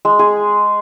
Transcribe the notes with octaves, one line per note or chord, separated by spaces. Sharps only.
G#3
G#4